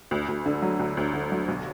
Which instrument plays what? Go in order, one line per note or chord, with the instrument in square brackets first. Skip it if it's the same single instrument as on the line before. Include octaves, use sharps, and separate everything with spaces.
[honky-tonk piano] D2
D2
D3
F#3
D2
D2
D3
F#3
B1